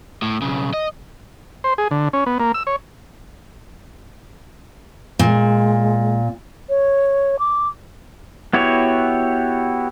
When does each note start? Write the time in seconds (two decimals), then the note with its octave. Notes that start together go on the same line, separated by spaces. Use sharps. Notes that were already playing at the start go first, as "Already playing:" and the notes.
0.22 A2
0.42 B1 C#3
0.74 D#5
1.64 C5
1.78 G#4
1.91 D3
2.13 C#4
2.26 B3
2.40 A#3
2.54 E6
2.67 C#5
5.19 A#2 G#3
6.69 C#5
7.39 D6
8.53 B3 E4 F#4 G4 C#5